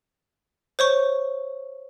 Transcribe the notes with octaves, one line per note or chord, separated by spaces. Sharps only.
C5 C#5 C#6